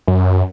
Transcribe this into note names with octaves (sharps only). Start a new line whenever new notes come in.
F#2